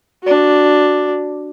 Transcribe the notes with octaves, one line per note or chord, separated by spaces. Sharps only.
D4 F#4